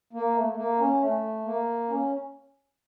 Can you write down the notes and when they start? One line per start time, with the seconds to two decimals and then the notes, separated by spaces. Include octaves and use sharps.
0.13 A#3
0.34 A3
0.50 A3
0.56 A#3
0.79 C#4
1.01 A3
1.45 A#3
1.89 C#4